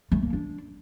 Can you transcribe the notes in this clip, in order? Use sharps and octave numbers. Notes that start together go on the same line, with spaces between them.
A3
A#3
D4